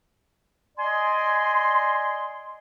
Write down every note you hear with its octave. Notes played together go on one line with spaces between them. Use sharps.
D5 D#5 G#5 C6